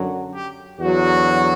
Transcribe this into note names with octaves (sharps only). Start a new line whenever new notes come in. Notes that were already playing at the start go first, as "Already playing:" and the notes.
Already playing: F#2 D3 F#3
G4
E2 D3 F#3 F#4